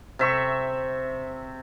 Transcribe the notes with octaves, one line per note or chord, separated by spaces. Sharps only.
C3 E5 C#6